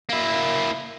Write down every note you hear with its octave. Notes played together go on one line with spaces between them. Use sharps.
A#3 E4